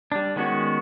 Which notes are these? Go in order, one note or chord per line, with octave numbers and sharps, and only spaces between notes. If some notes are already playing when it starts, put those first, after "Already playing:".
G3 D4
D#3 G#3 B3 C#4 F#4